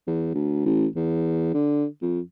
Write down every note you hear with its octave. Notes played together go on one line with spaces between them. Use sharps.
E2
D2
A1
E2
D3
F2